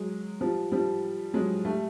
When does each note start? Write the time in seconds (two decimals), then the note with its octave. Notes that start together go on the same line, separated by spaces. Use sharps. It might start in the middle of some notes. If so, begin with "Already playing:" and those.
Already playing: F#3 G#3
0.40 F3 G3
0.72 F3 G3
1.34 F#3 G#3
1.65 G3 A3